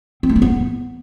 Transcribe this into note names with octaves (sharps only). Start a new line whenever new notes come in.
C4
A3
E4
B3